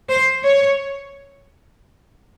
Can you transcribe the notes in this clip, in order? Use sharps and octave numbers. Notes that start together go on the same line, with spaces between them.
C5
C#5